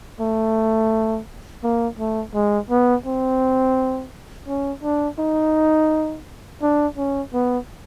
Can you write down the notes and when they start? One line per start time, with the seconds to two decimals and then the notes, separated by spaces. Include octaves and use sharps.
0.21 A3
1.63 A#3
1.99 A3
2.34 G#3
2.71 B3
3.06 C4
4.48 C#4
4.84 D4
5.19 D#4
6.62 D4
6.97 C#4
7.34 B3